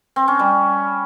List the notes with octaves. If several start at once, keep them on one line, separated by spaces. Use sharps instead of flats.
C4
C#4
G3